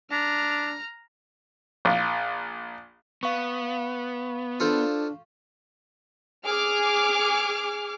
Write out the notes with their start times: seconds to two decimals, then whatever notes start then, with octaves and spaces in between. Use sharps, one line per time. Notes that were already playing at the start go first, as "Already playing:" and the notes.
0.11 D4 A#5 F6
1.85 A#1
3.23 B3 F5 C#6
4.60 D4 F4 A4 C5
6.45 G#4 D6 F6